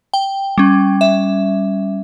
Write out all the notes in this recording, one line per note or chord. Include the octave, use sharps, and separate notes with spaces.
G5
G3 C#4
E5